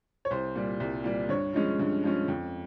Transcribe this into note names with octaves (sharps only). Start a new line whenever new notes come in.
C#5
C2 C5
A#2 G3
C2
A#2 G3
G2 C#5
F3 G#3 C#4
G2
F3 G#3 C#4
F2